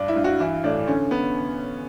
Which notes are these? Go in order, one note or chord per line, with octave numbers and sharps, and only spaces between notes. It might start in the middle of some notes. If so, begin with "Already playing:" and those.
Already playing: G2 D4
E4
G2
F#4
E3 E4
A2 D4
D3 C#4
B3